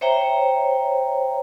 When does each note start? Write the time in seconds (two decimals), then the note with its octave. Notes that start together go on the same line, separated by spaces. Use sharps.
0.01 C5 C#5 E5 G5 A#5